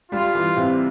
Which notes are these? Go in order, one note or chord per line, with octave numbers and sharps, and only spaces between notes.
G3 F4
E3
C3